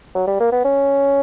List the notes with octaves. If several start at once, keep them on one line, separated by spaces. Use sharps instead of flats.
F#3
G3
A#3
B3
C#4